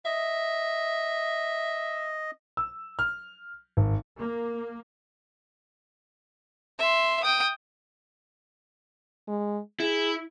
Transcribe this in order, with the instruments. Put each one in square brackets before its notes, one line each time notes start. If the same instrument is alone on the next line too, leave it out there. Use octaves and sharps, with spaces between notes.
[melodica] D#5 [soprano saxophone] E5
[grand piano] E6
F6
G#1
[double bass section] A#3
[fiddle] E5 C6
G5 D#6
[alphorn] G#3
[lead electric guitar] E4 [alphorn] G#4